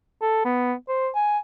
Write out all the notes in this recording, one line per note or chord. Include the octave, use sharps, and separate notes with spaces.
A4
B3
C5
G#5